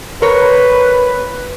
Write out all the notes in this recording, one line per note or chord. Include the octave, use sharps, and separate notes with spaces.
A#4 B4 C#5